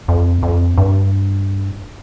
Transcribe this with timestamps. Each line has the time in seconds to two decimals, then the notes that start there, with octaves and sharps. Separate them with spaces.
0.08 F2
0.43 F2
0.78 G2